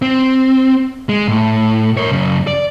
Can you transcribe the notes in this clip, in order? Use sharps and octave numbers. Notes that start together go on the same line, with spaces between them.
C4
G#3
A2
A#4 C#5
F#2 C#3
D5